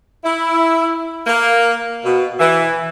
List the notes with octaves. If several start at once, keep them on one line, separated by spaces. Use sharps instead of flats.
E4
A#3
B2
E3